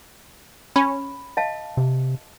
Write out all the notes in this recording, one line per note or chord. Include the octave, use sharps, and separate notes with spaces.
C#4 B5
D#5 F5 A5
C3